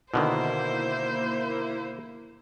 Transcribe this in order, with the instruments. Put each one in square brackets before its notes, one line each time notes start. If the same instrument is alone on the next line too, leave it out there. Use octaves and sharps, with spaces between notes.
[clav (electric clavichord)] B2 D3 D#3 [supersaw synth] A#3 E4 [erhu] C5